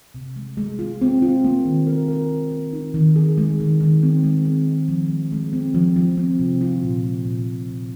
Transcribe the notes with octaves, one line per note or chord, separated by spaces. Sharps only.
C3
G#3
G#3
F4
C4
F4
A#3
D#3
A#4
A#4
D#3
A#3
D#4
D#3
G#4
G#3
D#3
D#3
C4
G#3
C4
G#3
F3
G#3
G#3
C4
F3
F3
C4
C3
F4
A#2
G#3
A#2
A#2
A#2